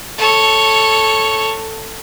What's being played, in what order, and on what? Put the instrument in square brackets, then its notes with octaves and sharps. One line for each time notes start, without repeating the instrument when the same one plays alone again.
[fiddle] A4 C#5